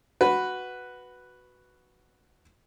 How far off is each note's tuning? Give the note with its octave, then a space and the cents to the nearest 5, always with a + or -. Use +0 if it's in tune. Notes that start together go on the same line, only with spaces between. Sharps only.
F#4 +0 B4 +0